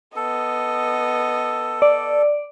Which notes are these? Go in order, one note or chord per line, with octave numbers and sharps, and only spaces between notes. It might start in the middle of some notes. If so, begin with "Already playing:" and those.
B3 A4 D#5
D5